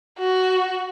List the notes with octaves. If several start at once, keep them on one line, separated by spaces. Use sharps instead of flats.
F#4